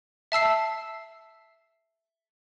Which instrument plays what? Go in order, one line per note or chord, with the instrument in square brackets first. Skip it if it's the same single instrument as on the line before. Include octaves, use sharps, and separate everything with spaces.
[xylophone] E5 A5 E6 C7